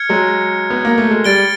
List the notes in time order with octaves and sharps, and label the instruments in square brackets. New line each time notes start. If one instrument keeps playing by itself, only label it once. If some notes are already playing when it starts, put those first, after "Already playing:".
Already playing: [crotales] F6 G#6 C#7
[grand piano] F#3 G#3
B3
A#3
A3
G#3
[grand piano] G3 [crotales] A6 D7 G7